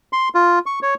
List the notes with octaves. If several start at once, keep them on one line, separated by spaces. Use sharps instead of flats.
C6
F4
C#6
C#5